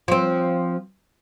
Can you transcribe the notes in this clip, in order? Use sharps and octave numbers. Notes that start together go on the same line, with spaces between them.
F3 C4